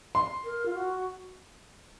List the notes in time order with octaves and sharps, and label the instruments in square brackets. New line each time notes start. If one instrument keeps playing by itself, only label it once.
[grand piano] C6
[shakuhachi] A#4
F4
F#4